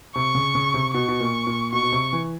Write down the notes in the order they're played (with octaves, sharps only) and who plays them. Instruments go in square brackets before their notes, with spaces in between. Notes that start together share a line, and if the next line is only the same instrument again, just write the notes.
[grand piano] C3 [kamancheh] C#6
[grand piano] C#3
C#3
C3
[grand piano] B2 [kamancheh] C#6
[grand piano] B2
A#2
A#2
[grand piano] B2 [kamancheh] C#6
[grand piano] B2
C3
E3